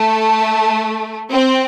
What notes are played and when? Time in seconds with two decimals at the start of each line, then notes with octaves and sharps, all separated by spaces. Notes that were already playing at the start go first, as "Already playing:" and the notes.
Already playing: A3
1.31 C4